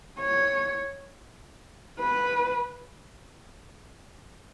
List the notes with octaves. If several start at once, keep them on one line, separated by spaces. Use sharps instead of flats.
C#5
B4